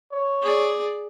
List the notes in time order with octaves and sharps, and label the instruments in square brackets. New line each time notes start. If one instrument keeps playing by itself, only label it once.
[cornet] C#5
[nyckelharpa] G#4 D5